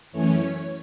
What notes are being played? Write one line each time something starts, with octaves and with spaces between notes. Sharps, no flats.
F#2 E3 A3 C#4 C#5